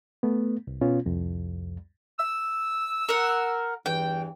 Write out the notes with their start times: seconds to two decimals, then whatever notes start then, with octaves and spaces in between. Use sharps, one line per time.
0.23 A3 B3
0.67 C2
0.81 B2 B3 C#4 F4
1.06 C2 F2
2.19 E6
3.09 A#4 F#5
3.86 E2 G2 E3 G5